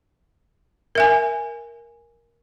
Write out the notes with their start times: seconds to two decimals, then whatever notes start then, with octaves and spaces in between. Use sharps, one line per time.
0.95 A#4 E5 G#5